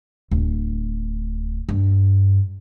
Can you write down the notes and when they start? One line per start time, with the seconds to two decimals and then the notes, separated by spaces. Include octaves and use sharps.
0.31 D1
1.69 G2